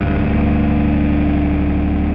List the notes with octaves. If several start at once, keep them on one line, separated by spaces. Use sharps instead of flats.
D1 D2 G2